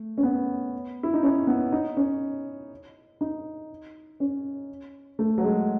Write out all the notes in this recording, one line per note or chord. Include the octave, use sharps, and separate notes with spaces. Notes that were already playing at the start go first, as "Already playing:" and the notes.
Already playing: A3
C#4
B3
E4
D#4
C#4
B3
D#4
C#4
D#4
C#4
A3
F#3
G#3